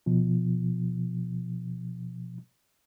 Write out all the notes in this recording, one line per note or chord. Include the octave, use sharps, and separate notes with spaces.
B2 F3